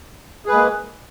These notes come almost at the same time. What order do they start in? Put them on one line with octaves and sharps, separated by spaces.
G#4 B4 G#3 A#3